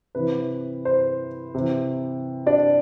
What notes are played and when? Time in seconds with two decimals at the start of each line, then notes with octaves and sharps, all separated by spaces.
0.15 C3 E3 B4
0.85 C5
1.55 C3 E3
2.46 D4 D5